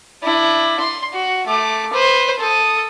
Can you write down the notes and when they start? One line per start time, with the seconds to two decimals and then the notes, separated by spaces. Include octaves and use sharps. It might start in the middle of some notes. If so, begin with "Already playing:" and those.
0.23 D4 E4
0.80 C6
1.13 F#4
1.47 A3 D6
1.93 B4 C5
2.39 A4 D#6